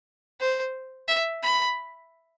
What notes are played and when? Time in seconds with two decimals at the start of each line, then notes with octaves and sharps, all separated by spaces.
0.40 C5
1.08 E5
1.43 B5